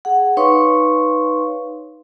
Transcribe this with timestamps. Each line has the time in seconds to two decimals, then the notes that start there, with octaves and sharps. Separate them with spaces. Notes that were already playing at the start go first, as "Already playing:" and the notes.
0.05 G#4 F#5
0.37 D#4 B4 C#5 F5 C6 C#6